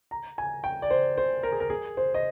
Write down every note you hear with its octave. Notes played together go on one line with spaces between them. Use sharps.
A#5
G#5
G5
D5
C5
C5
A#4
G#4
A#4
G#4
C5
D#5